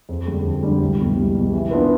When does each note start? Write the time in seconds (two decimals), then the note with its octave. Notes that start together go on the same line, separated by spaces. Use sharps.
0.09 F2
0.26 D3 G3 D4 G4
0.45 F2
0.63 D3 G3 D4 G4
0.81 C2
1.00 B2 G3
1.18 C2
1.35 B2 G3
1.53 E3
1.71 B3 D4 F4 B4